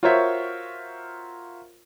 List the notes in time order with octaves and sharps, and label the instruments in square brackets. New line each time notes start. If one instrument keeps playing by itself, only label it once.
[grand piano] F4 F#4 A#4 C5 C#5 E5